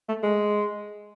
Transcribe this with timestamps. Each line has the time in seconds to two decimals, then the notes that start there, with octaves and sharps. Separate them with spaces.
0.09 A3
0.23 G#3